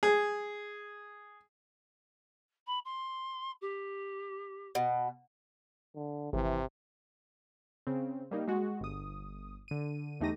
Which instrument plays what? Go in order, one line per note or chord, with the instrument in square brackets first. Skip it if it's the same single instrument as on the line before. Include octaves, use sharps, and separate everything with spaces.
[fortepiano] G#4
[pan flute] B5
C6
G4
[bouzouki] B2
[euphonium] D3
[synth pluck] G#1 [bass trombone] C3 [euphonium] E3
[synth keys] C#3 C4
G3 A#3 D#4
G#3 F#4
G1 D#6
D3 D#7
E2 A3 D#4 G4 A#6 D#7